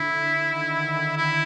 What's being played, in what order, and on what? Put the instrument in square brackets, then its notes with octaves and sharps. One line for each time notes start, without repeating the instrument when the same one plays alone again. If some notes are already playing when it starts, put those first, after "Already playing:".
Already playing: [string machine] D3 [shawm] E4
[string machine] D#3
[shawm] E4